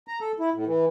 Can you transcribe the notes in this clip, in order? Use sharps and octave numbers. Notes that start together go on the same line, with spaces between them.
A#5
A4
E4
A2
E3